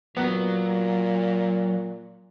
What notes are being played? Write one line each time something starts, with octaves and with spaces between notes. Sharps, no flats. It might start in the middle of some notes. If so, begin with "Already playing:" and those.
A#2 F#3 B3